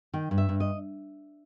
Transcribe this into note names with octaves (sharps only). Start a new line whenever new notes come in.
D#3 G5
G2
E5
G2
D#5